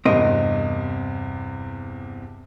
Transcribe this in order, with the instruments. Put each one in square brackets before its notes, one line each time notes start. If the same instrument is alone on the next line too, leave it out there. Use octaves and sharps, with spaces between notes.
[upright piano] E2 G2 C3 [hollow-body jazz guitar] C4 A#4 D#5